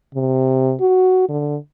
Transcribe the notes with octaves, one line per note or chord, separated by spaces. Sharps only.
C3
F#4
D3